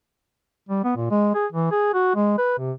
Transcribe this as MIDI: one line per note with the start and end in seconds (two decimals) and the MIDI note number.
0.69 0.82 55
0.84 0.92 59
0.96 1.10 46
1.11 1.30 56
1.35 1.46 68
1.52 1.70 52
1.71 1.93 68
1.94 2.12 66
2.15 2.35 56
2.38 2.57 71
2.58 2.72 48